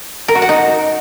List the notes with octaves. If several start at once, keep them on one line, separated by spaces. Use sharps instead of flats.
A#4
F#4
F#5
D#4